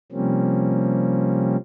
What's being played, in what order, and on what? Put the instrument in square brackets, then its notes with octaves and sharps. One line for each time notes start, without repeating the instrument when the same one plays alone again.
[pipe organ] C3 F3 G3 A#3 C4 C#4